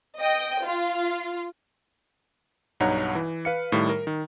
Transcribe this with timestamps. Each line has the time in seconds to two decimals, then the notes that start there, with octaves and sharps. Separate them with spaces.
0.18 D#5 G5
0.63 F4
2.80 B1 G2 D#4 C#5 F#5 A#5
3.15 E3
3.45 B4 F5 C#7
3.72 A2 D#3 G3
3.89 A#4
4.07 D#3